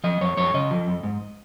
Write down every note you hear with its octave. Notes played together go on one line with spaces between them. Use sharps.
F3 D#5
F2 C#5
F2 C#5
C#3 D#5
F3
F2
G#2